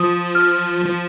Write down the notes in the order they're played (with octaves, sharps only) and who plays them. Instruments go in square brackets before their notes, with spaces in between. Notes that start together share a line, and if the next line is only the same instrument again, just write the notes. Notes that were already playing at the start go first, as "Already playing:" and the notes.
Already playing: [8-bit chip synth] F3 [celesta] D#6
[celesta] F6
[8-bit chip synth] F3